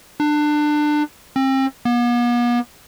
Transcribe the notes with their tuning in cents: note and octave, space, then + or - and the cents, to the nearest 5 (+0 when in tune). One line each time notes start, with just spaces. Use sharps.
D4 +25
C4 +35
B3 -45